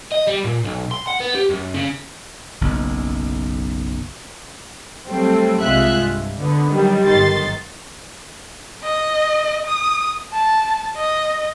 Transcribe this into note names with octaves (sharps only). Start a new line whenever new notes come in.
D#5
G3
A#2
B1
C6
F#5
B3
G4
F#2
C#3
F#1 B1
F#3 G3 A3 C4
C2 C3 G#3 F4 E5 F#6
G2
D3 B3
D#3 F#3 G3
G1 D#3 C6 A6
D#5
D#6
A5
D#5